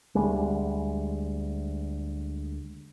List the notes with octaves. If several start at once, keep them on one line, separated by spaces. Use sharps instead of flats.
D2 G3 G#3